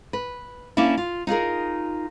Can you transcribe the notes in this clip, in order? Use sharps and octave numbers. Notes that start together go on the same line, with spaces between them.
B4
A#3 C#4 D4 E4
F4
D#4 F4 G#4 A#4